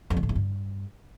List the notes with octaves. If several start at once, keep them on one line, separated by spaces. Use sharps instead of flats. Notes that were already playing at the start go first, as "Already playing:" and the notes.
F2
A#2
A2
E2
G2